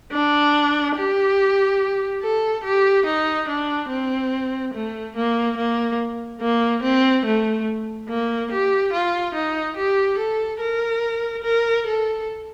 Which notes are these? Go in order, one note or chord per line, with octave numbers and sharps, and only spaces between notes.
D4
G4
A4
G4
D#4
D4
C4
A3
A#3
A#3
A#3
C4
A3
A#3
G4
F4
D#4
G4
A4
A#4
A#4
A4